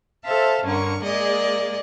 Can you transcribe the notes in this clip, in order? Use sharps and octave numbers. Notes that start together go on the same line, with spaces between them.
A4 C5 E5 F5 A5
G2 D3 C#4 A#4 C#6
G#3 A#3 G#4 D5 D#5